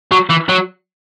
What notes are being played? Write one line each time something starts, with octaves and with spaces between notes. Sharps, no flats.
F#3
E3
F#3